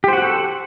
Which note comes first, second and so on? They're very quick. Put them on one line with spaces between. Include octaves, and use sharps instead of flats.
G4 C5 F#4 F#5 A4